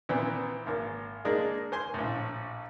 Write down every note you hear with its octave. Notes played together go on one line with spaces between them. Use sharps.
A#2 E3 B3 C4
G#1 A#3
G#3 A#3 D4 D#4 G#4
C5 G#5 C6
A#1 A2